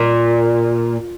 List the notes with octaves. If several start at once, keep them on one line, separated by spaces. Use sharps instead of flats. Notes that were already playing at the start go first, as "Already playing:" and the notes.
Already playing: A#2